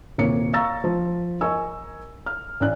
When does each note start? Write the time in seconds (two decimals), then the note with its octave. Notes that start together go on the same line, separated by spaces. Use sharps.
0.18 D#1 C2 A#3 C#5 C#7
0.53 F5 A#5 C#6 E6 A6
0.84 F3
1.41 A#4 D#5 G#5 C#6 E6
2.26 F6
2.60 A1 C#4 D5 F#6